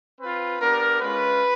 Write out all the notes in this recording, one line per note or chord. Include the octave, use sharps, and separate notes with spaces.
C4 F4 B4
B3 D4 G4 A#4
G#3 C#4 F4 B4